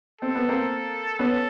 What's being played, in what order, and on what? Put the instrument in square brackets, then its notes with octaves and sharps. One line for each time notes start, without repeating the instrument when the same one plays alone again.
[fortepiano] C4 [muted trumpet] A4
[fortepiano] B3
A#3 C4
[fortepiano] B3 C#4 [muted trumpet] A4